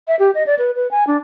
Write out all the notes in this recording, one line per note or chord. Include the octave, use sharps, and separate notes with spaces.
E5
G4
D#5
D5
B4
B4
G#5
D4